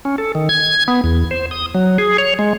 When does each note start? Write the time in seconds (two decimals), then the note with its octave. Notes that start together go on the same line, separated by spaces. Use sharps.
0.05 C#4
0.18 A4
0.35 D#3
0.49 G#6
0.88 B3
1.04 E2
1.31 C5
1.51 D#6
1.75 F#3
1.98 G#4
2.18 C#5
2.39 G#3